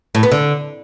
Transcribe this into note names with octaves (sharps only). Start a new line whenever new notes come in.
A2
B3
D3